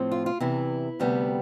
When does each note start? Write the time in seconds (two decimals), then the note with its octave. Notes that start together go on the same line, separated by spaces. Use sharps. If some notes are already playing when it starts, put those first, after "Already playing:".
Already playing: A2 F3 C4
0.12 F4
0.26 F4
0.40 E2 C3 E3 E4
1.00 D2 C3 G3 B3